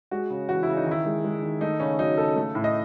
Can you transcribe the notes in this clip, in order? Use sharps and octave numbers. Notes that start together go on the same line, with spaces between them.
G#3 F#4
C#3
E3 F#4
C#3 E4
D#4
D#3
E4
G#3
G#3
D#3
A3 D#4
C#3 C#4
F#3 D#4
C#3 A4
A3
A2
D#5